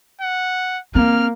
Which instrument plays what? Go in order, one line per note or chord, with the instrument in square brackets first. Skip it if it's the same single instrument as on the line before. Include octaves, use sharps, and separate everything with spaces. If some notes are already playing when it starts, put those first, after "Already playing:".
[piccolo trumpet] F#5
[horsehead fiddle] A#3 [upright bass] C4 [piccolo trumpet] F6